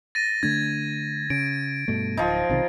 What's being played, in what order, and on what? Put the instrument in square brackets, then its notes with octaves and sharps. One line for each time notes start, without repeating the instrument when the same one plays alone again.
[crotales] A6 A#6 D#7
[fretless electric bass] D3 A3 D4 [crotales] G#6
[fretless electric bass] C#3 [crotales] D7
[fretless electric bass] G2 B2 A3
[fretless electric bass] D1 [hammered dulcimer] F3 D#4
[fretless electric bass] B1 C3 D#3